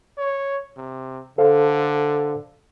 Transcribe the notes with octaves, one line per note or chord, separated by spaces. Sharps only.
C#5
C3
D3 A4 C5 F5